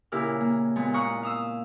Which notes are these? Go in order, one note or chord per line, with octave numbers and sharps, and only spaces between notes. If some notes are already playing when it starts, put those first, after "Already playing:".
A#2 C#3 E4 G4 A#4 F6
A#3
A#2 G#3 B3
F5 A#5 C#6 D#6 F#6
F5 D#6 E6